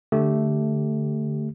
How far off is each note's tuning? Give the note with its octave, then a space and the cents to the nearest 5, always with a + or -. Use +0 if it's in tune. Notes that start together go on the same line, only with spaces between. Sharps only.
D3 +0 A3 +0 G4 -10